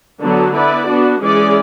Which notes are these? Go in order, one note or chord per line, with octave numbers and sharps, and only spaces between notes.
D3 F#3 B3 D4 F#4
B3 E4 B4 D5
B3 D4 F#4
E3 G#3 C#4 G#4 D5